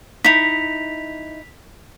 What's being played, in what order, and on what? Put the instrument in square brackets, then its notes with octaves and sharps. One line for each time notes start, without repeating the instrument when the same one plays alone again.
[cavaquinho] D#4 E4 [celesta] B6 F7